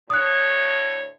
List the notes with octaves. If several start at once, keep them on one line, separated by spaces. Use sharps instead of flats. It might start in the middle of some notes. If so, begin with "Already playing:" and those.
D2 A2 C#5 D#6 F#6